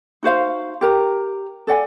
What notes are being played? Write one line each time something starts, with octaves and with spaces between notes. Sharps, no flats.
D#4 F#4 C5 F5
G4 A#4 A#5
A4 D5 F#5 G#5